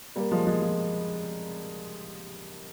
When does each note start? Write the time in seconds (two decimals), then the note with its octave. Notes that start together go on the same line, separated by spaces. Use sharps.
0.16 G3 A#3
0.31 F3 G#3
0.47 F3 G#3
0.62 F3